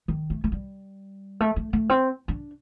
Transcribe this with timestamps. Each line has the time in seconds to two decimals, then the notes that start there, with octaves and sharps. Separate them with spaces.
0.08 D#3
0.30 A3
0.44 A3
0.52 G3
1.40 A3
1.56 A3
1.73 A3
1.89 C4
2.28 D4